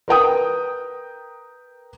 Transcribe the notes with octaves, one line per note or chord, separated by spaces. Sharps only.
A#4 B4 G5 D#6